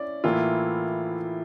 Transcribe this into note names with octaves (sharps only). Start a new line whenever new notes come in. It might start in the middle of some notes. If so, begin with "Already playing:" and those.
Already playing: C#4 E4 D5
A2 E3 A#3 E4 F4